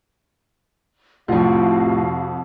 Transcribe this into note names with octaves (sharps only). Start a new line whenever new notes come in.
C2 F2 A2 G3 F4 F#4 F5